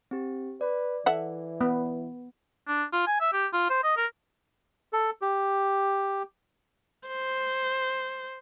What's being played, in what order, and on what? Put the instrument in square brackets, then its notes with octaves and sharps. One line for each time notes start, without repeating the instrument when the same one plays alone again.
[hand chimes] C4 G4
[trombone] B4 [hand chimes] D5
[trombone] E3 [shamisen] A4 E5 F#5
[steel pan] B3
[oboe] D4
F4
G#5
E5
G4
F4
C5
D#5
A#4
[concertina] A4
G4
[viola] C5